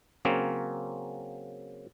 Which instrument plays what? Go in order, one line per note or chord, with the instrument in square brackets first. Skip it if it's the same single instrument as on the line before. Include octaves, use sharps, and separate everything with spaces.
[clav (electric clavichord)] C#3 F#3 A#3 C4 C#4